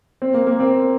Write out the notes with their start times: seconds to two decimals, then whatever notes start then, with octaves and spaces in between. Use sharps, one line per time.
0.22 C4
0.34 A#3
0.47 A#3
0.60 C4